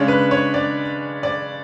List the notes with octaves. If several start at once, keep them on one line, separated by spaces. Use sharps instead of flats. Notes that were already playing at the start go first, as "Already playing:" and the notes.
Already playing: C#3 G#3 D4 C#5
B4
C#5
D5
D5